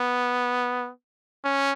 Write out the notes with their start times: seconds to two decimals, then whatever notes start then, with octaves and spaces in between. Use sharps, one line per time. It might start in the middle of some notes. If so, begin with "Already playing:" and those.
Already playing: B3
1.45 C#4